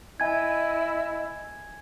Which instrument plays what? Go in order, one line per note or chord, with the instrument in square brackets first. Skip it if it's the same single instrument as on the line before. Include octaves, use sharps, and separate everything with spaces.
[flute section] E4 D#5 [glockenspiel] G#5 G#6